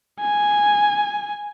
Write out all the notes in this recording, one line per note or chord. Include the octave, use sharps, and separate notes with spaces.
G#5